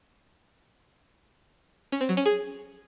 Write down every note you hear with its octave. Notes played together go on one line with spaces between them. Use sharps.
C#4
C4
F#3
C#4
G#4